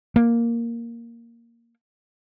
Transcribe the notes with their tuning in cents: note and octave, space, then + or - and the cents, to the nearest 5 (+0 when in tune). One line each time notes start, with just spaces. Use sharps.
A#3 +0